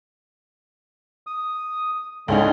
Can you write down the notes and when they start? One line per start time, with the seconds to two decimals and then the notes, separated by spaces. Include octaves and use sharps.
1.27 D#6
2.28 C#2 D3 G#3 C#4 D#4